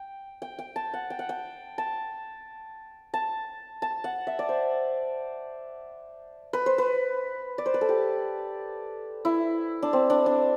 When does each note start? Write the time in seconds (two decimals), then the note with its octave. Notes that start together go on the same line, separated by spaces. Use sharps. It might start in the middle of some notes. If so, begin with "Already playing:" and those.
Already playing: G5
0.42 G5
0.59 G5
0.76 A5
0.94 F#5
1.10 G5
1.19 F#5
1.29 G5
1.78 A5
3.14 A5
3.82 A5
4.04 F#5
4.27 E5
4.39 D5
4.49 C5
6.53 B4
6.66 C5
6.78 B4
7.58 D5
7.66 C5
7.74 B4
7.81 A4
7.89 G4
9.25 E4
9.82 D4
9.93 C4
10.10 D4
10.26 D4